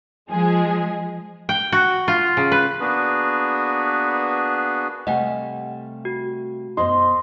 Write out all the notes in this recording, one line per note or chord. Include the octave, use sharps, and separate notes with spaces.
F3 G#3 G#4
G5
F#4
F4
C#3
B4
A#3 B3 D4 F#4 G#4 B4
C3 G3 A3 D#5 F5 F#5 G#5
F#4
F#2 B2 D#4 C5 D#5 C6